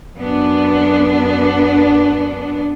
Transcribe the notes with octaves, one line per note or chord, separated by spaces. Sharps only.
F#2 B3 D4